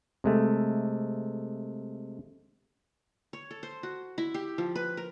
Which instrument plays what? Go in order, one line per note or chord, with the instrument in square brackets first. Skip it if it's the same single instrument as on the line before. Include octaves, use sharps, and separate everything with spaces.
[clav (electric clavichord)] C3 G#3 A3
[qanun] C#5
A4
C5
F#4
E4
G4
F3
B4
A#4